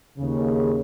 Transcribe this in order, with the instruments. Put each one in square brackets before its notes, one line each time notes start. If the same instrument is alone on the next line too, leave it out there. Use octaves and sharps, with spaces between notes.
[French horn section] D#2 C#3